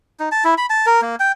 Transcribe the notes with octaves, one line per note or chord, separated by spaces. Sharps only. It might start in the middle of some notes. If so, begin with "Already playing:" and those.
D#4
A5
E4
B5
A5
A#4
A#3
G5